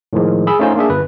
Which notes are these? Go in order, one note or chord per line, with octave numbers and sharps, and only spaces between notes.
A2 D#3 F3 G#3
G#4 B5 E6
A3 C#4 D#4 F4 C5
A#3 D4 G#4 E5
G1 B4